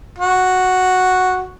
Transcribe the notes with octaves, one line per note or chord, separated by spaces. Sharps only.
F#4